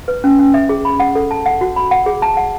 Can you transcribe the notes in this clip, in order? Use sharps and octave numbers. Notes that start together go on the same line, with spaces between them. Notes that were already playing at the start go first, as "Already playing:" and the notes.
B4
C#4
C#4
E5
G#4
B5
F#5
A4
A5
F#5
F#4
B5
F#5
G#4
A5
F#5